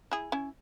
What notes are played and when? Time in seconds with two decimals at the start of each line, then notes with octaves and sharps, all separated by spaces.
0.12 E4 G#4
0.32 C#4 E4